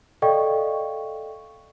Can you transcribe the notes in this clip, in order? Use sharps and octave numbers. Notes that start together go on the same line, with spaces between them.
A4 D5 D#5 F5 G5 C#6